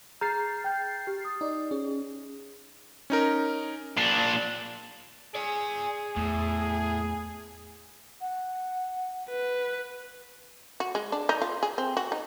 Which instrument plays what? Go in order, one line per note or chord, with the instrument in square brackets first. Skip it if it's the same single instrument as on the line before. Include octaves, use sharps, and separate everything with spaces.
[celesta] G#4 A#5 G6 [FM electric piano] F6 A6 C7
[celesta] G5 G6
G4
D#6
[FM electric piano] D#4 D5
[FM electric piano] C#4 [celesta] G#4
[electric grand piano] C#4 D#4 A#4
[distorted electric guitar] A#2 D4 [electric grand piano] C7
[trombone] G#4 [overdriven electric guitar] D5 G#5
[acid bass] E2 [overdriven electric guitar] A2
[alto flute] F#5
[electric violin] B4
[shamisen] F#4
G#3
D4
D#4
F4
G#4
C4
F#4
D#4